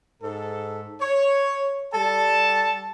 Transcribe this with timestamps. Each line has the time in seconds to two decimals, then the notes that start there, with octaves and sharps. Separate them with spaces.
0.23 G#2 A4
1.01 C#5
1.94 G3 A4 A5